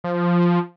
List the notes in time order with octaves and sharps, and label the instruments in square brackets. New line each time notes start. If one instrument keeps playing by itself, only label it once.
[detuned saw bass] F3